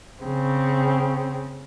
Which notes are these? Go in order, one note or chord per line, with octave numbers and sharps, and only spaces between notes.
C#3 C4